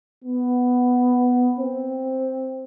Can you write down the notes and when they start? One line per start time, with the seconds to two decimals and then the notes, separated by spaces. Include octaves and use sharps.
0.24 B3
1.59 C4